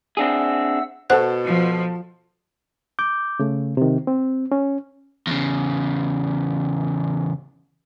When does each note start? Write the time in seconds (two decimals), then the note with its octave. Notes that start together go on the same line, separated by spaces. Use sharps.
0.17 C4 D4 G#4 E5 F#5 E6
1.10 B2 F#4 A4 C5 F#5 F#6
1.45 F3
2.99 D6 G6
3.40 C#3 A3
3.77 C3 D#3
4.07 C4
4.52 C#4
5.27 E2 C#3